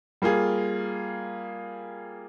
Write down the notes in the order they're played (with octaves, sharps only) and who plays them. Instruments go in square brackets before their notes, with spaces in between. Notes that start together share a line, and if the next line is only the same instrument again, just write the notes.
[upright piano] G3 A#3 F4 G#4